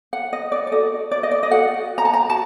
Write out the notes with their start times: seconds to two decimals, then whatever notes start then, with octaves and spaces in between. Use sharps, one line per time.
0.13 F#5
0.33 D#5
0.52 D5
0.67 D5
0.72 F#4 A4 D#5
1.11 D5
1.23 D#5
1.31 D5
1.43 D#5
1.50 F#4 A4 F#5
1.98 A#5
2.05 A5
2.13 A#5
2.30 F#4 A5